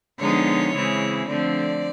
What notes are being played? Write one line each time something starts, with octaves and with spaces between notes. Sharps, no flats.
D3 F3 G#3 B3 D#4 C#5
C#3 E3 G#3 C4 E4
D3 F3 A3 C4 D5